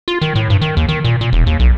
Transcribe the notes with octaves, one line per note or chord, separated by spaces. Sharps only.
F4
D#3
A2
G2
D#3
D#2
D#3
A#2
A#2
E1
D#2
B1